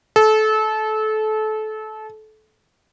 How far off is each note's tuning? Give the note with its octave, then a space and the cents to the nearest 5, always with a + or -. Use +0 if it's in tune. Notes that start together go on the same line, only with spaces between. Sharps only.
A4 -25